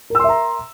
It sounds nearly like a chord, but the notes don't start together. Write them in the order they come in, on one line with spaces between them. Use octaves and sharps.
A#4 E6 C6 E5 A#5